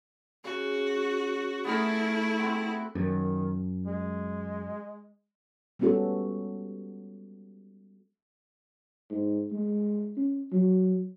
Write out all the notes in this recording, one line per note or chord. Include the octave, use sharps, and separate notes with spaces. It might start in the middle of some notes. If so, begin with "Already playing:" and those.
C#3 F#4
A3 B3 E4 G#4 A#4
B3 C4 F#4
F#2 D#3
G#3
G3 G#3 B3 C#4 F#4 A4
G#2
G#3
C#4
F#3